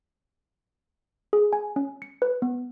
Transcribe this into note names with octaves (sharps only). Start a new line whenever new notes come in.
G#4
G#5
C#4
C#7
B4
B3